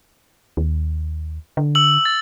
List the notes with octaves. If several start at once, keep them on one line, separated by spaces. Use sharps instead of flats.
D#2
D3
E6 F#7
A6